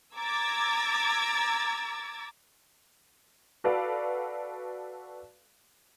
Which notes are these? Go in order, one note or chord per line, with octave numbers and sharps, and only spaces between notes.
A#5 D6 E6 G#6 A6
F#4 A4 B4 D5 F5